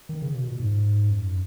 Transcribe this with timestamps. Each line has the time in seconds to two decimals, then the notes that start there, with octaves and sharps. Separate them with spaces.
0.09 D#3
0.22 C#3
0.35 B2
0.47 A#2
0.60 G#2
1.10 F#2